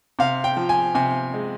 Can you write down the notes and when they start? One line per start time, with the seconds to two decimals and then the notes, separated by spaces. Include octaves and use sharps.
0.19 C3 F5
0.44 G5
0.57 F3
0.69 G#5
0.95 C3 G#5
1.34 G#3